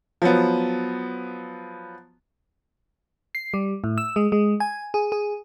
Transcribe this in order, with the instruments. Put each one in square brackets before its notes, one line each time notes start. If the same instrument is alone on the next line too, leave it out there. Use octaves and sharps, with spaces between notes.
[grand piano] F3 F#3 B3
[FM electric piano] C7
G3
A2
E6
G#3
G#3
G#5
G#4
G#4